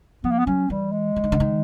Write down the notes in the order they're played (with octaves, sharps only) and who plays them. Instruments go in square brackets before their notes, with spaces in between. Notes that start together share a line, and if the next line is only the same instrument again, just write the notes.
[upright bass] F3 [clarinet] B3
[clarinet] A#3
B3
[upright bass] F#3 [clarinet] C#4
[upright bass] E3 [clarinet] G3
[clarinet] G#3
[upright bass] E3
D#3
D3
D#3